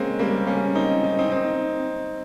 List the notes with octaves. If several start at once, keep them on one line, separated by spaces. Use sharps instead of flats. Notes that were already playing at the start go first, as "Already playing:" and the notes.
Already playing: G#3 A#3 C4 C#4
G3 A#3
A#3 C#4
C4 D#4
D#4
C4 D#4
C4 D#4